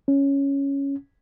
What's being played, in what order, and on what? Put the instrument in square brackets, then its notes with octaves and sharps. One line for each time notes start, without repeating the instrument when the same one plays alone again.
[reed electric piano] C#4